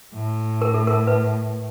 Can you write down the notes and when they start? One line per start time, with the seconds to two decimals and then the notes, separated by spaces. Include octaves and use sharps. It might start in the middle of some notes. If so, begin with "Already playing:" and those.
0.14 A2
0.62 A#4
0.74 A4
0.87 A#4
1.07 B4